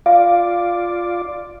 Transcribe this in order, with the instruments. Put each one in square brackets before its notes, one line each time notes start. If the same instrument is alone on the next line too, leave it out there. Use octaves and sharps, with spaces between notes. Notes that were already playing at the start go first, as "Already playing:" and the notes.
[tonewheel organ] F4 D5 [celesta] F5